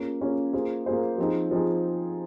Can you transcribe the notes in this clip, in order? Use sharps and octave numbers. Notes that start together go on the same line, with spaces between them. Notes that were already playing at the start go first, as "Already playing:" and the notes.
Already playing: A#3 C#4 F4 G#4 C#5
A#3 C#4 F4 G#4 C#5
A#3 F4 G#4 C5
A#3 F4 G#4 C5
F3 C4 D#4 G#4
F3 C4 D#4 G#4